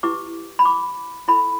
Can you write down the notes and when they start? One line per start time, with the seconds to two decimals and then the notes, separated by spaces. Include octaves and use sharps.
0.03 E4 G4 B4 D6
0.59 B5
0.65 D6
1.28 E4 A4 B5